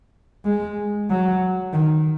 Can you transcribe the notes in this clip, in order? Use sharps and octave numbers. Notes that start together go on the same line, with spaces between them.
G#3
F#3
D#3